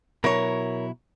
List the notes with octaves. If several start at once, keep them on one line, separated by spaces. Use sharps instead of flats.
B2 F#3 E4 A#4 C#5